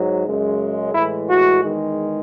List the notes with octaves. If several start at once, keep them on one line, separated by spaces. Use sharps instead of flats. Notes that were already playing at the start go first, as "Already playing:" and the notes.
Already playing: G#2 F#3
F#2 C#3 G#3
A2 E3 G#3 E4
F#4
E2 D#3 G#3